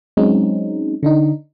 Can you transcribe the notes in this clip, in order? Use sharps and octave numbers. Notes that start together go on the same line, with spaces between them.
F#3 G#3 C4 C#4 D#4
D3 D4 D#4